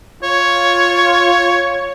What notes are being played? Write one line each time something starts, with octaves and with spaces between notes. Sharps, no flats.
F4 C#5